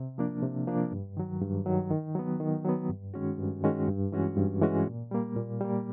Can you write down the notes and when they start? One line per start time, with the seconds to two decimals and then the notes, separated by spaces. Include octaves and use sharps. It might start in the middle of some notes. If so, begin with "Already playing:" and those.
Already playing: C3
0.18 F3 A#3 D4
0.42 C3
0.67 F3 A#3 D4
0.92 G2
1.17 D#3 F#3
1.41 G2
1.66 D#3 F#3
1.90 D#3
2.15 F#3 B3
2.40 D#3
2.65 F#3 B3
2.89 G2
3.14 D#3 G#3 C#4 F#4
3.38 G2
3.64 D#3 G#3 C#4 F#4
3.88 G2
4.12 E3 G#3 C#4 F#4
4.37 G2
4.61 E3 G#3 C#4 F#4
4.87 A#2
5.11 G3 A#3
5.36 A#2
5.60 G3 A#3